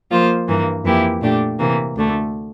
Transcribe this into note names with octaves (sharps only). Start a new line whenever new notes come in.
F3 A#3 F4 C5
G2 E3 A#3
F2 E3 A#3 E4 G4
A#2 A3 D4 G4
C3 E3 A#3
D2 D3 A3